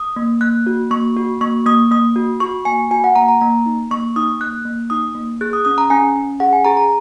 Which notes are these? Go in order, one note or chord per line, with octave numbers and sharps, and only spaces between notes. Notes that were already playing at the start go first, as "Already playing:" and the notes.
Already playing: D#6
A#3
A#3 F#6
F#4
A#3 C#6
F#4
A#3 C#6
A#3 D#6
A#3 D#6
F#4
F#4 C#6
A#3 G#5
F#4 G#5
F#5
A#3 A#5
A#5
A#3 A#5
D#4
A#3 C#6
D#4 D#6
A#3 F#6
A#3
D#4 D#6
A#3
G#4 F#6
D#6
C#4 D#6
A#5
C#4 G#5
C#4
G#4 F#5
G#5
G#4 A#5
A#5